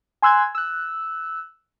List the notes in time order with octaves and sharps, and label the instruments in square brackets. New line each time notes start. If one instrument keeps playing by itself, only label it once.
[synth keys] G#5 C6 E6 F#6 G#6
E6 F#6